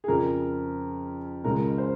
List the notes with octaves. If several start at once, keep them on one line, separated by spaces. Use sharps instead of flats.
G#4
F2 C#3 F3 A#4
C#2 C#3 G#3 C#4 A#4
C5